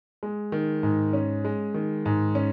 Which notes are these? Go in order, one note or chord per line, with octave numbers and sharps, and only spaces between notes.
G#3
D#3
G#2
C#4
G#3
D#3
G#2
C#4